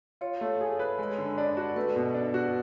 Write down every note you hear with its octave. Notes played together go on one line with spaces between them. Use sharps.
F4 C#5
A3
G#4
B4
G#3
D3
D4 D5
F#4 D5
A3 B4
B2
D4
F#4